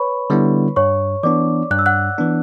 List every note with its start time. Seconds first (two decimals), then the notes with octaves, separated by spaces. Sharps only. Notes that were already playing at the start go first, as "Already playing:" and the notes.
Already playing: B4 C#5 B5 C#6
0.30 D3 G3 B3 E4
0.76 G2 C#5 C#6
1.23 E3 B3 D4 D5 D6
1.71 G2 F#6
1.79 E6
1.86 F#5 F#6
2.18 E3 B3 D4